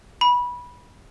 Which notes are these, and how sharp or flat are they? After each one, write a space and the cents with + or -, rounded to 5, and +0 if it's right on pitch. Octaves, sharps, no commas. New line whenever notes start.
B5 -20